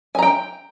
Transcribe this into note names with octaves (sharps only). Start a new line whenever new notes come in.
G5 G#5 A#5